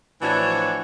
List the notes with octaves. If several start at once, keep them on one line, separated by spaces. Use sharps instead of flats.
A2 E3 F3 D4 F#4 C#5